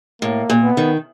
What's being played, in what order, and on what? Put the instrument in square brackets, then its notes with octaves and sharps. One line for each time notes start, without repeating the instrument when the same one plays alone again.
[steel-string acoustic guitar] A2 [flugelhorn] A#3
[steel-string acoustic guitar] A#2
[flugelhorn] B3
[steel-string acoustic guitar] D#3